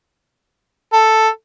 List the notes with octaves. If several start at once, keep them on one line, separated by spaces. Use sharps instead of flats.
A4